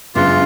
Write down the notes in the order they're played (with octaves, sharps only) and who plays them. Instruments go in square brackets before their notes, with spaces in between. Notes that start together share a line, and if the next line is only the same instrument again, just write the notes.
[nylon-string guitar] F#2 C#3 G#3 B3 D4 [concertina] F4